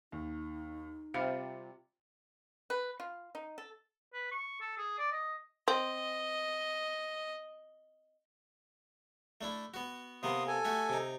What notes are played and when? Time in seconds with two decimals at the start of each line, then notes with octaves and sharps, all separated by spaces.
0.12 D#2 D#4
1.14 C3 G3 F4 C#7
2.70 B4
3.00 F4
3.35 D#4
3.58 A4
4.13 B4
4.31 C#6
4.61 A4
4.77 G#4
4.98 D5
5.12 D#5
5.68 C4 D#5
9.41 A3 D4 E4
9.74 B3 F#4
10.23 C3 A#3 B3 C6 D#6
10.47 A4 G#5
10.65 A3 F#4 G4
10.89 C3 D#4